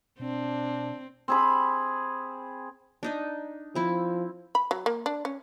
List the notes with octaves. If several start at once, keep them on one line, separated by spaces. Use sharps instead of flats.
B2 C4 D4
C4 G#4 B5
D4 D#4 D#5
F3 C4 E4
B5
F#3
A#3
D4
C#4